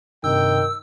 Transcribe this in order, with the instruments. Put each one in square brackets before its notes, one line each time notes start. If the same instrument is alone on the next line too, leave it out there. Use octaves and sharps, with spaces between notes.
[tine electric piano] G2 C3 [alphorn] D#3 [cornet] G5 [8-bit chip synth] E6